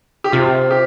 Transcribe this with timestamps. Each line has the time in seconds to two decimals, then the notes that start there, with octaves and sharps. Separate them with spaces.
0.24 G4
0.32 C3 F4
0.71 G4